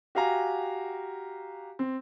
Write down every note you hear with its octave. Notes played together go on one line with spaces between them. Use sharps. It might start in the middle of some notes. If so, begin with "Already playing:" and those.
F#4 G4 F5 G#5 A#5
C4